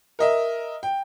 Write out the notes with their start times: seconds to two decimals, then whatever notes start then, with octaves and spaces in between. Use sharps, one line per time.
0.19 A#4 D#5 E5
0.83 G5